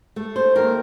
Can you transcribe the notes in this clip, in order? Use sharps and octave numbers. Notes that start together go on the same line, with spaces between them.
A3
C5
D#2 A#4